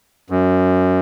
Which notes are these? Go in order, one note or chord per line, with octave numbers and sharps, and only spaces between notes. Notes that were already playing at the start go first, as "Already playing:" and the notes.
F#2